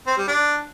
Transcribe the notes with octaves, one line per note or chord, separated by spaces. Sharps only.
C4
G3
D4